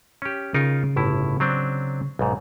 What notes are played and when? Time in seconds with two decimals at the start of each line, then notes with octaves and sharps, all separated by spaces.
0.22 C#4 G4
0.54 C#3 D#4 F4 A#4
0.96 G1 A2 E4
1.40 F#3 C4 D4
2.19 B1 G#2